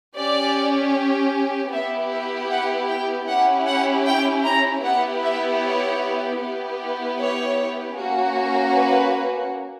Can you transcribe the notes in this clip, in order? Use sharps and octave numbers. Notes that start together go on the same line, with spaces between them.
C#4 G4 D5
B3 E4 G4 E5
E5
F#5
G5
C#4 E4 G4 F#5
F#5
G5
A#5
B3 E4 G4 F#5
E5
C#5
B3 E4 G4
C#5
A#3 C#4 F#4
B4